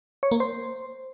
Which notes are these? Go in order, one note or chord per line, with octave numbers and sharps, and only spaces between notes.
C#5
A#3
C5